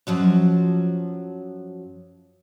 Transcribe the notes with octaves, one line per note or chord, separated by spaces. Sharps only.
F#2 F3 F#3